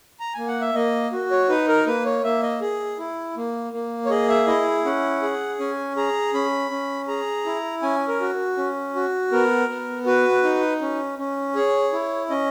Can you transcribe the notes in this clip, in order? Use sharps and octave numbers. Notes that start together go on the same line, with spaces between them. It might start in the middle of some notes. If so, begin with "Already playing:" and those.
A#5
A#3 G#5
F#5
E5
A#3 D#5
F#4
C#5
D#4 B4
A#4
A#3 B4
C#5
A#3 E5
D#5
G#4
E4
A#3
A#3
C#5
G#4 D#5
E5
E4 D#5
C#4 F#5
G#4
C#4 G#5
G#4 A#5
C#4 B5
C#4
G#4 A#5
E4
C#4 G#5
A#4
F#4
C#4
F#4
B3 A#4
B3
F#4 B4
D#4
C#4
C#4
G#4 C#5
E4
C#4 D#5